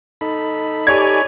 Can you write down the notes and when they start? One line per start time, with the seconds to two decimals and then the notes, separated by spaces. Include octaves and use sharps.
0.21 D#4 A4 B5
0.87 G4 C#5 D5 G#5 G#6